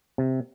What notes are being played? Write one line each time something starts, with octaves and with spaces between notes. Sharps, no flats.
C3